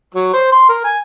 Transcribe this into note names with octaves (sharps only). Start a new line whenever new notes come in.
F#3
C5
C6
A#4
G#5